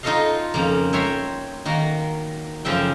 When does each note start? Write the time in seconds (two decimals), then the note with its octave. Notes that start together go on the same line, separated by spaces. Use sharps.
0.03 D#4 F4 F#4 A4 D#5 F5
0.54 F2 C#3 A#3
0.93 C#5 E5 G5 A#5 C6
1.65 D#3 A#3 F#4
2.65 F#2 C#3 F3 E5 G5